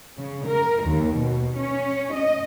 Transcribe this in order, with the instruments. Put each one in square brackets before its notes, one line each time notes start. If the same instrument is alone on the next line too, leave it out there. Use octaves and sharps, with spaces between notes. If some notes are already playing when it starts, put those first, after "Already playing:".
[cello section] C#3
A#4
D#2
B2
C#4
D#5